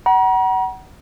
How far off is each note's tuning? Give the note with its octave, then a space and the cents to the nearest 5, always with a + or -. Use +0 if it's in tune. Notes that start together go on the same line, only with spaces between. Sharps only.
F#5 +30 A#5 +40